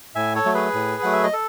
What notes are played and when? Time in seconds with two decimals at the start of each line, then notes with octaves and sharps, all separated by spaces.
0.15 A2 E5 G#5
0.35 A4 C#5
0.45 F#3 A3
0.54 G#4 B4
0.74 A2
1.03 F#3 A3 F#5
1.13 E5
1.23 D#5
1.33 A4